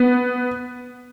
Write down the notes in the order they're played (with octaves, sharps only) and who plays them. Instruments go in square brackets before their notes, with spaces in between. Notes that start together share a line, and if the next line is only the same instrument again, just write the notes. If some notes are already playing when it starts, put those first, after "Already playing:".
Already playing: [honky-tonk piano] B3